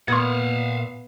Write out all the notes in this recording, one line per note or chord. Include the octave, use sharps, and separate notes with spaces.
A#2 B3 F5 F#5 C6 D#6 G#6